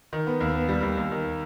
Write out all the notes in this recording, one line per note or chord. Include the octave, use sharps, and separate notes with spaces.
D#3
B3
D#2
B3
G3
D#2
D#2
D#3